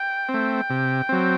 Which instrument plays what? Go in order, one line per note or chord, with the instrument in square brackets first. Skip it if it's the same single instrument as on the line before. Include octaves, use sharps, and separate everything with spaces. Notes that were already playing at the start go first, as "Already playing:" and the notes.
Already playing: [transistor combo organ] G5
C4
A3
C3
F#3 C4